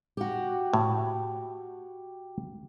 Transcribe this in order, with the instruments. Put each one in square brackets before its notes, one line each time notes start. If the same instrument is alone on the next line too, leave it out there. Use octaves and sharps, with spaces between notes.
[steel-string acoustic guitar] F#4 G4
[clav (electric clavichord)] A2